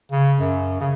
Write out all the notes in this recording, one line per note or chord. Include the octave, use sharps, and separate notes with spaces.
C#3
F#2
C#3